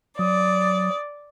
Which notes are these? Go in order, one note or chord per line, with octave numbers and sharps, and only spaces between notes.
F#3 D5 D#6